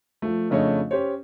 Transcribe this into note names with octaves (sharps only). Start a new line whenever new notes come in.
F3 A3
F2 C#3 A3 D4 C#5 D#5
C#4 G4 C5 C#5